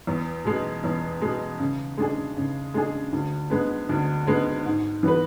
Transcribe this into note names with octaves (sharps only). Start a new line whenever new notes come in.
E2
B2 G#3
E2
B2 G#3
C#3
G#3 D4 G#4
C#3
G#3 D4 G#4
D2
D3 G#3 B3
D2
D3 G#3 B3
G#2
E3 B3 F#4 B4